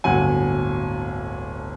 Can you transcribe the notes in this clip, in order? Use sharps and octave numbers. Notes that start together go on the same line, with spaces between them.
D1 G1 F#5 G#5